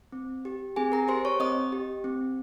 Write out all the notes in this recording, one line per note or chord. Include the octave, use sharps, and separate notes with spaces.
C4
G4
C4 G#4 G#5
A#4 A#5
G4 C5 C6
C#5 C#6
C4 D#5 D#6
G4
C4